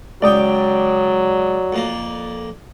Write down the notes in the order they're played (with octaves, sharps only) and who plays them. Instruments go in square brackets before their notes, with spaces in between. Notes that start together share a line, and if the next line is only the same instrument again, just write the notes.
[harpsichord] C#2 G5 [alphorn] F#3 [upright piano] D5 D#6
[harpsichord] F2 A#3